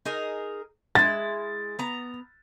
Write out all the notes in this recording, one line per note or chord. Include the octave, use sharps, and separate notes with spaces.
D#4 G#4 A#4
G#3 E4 A6
B3 A#5